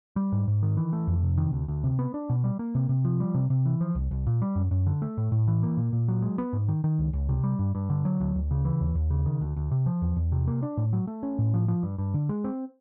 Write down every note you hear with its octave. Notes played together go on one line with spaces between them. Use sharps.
G3
G#2
G#2
D#3
E3
A3
F2
C3
D#3
D2
D2
C3
B3
D4
B2
G3
A#3
C3
C3
F3
G3
C3
C3
E3
F3
C2
C2
A#2
G3
F#2
F#2
D3
A3
A2
A2
E3
A#3
A#2
A#2
F#3
G#3
B3
G#2
D#3
D#3
C#2
C#2
C3
G3
G2
G2
D3
F#3
D2
D2
C#3
E3
D#2
D#2
C#3
D#3
D2
D2
C3
F3
E2
E2
C3
A#3
D4
A2
F#3
A3
C#4
A2
F3
F3
G2
G2
D3
G#3
C4